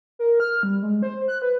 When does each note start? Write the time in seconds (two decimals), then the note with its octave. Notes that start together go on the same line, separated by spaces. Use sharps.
0.19 A#4
0.40 F6
0.63 G3
0.82 G#3
1.02 C5
1.28 F#6
1.42 B4